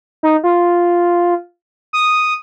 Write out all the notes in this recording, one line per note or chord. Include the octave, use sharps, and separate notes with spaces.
D#4
F4
D#6